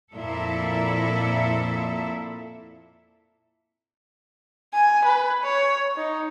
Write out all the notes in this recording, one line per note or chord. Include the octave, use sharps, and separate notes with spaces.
F2 A#2 A#3 E4 A4 E5
G#5
B4
C#5
D#4